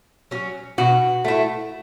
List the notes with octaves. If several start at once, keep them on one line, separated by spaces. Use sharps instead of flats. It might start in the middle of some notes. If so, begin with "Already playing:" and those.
F#3 C#4
B2 F#4
A3 E4